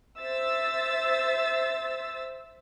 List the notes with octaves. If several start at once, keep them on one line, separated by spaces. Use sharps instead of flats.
C5 E5 E6 A6